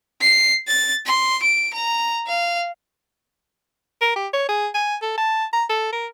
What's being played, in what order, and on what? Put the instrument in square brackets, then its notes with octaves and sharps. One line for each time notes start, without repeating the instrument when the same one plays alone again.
[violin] C7
A6
C6
D7
A#5
F5
[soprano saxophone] A#4
G4
C#5
G#4
G#5
A4
A5
A#5
A4
A#4